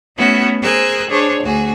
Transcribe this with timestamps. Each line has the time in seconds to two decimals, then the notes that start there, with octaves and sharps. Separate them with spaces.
0.16 A3 B3 C#4 E4 F#4
0.62 G#4 A#4 C5 G#5 E6 F#6
1.09 D4 G#4 C5 C#5
1.43 D2 F#4 G#4